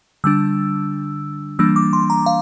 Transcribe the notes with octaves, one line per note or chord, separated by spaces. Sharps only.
D3 G3 D4 E6
E3 G3 A#3 D4 E6
D6
C6
A#5
F5